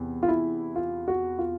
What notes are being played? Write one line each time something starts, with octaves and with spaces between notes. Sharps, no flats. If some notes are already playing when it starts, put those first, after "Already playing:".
Already playing: E2 C3
F4
E4
F4
F#4
F4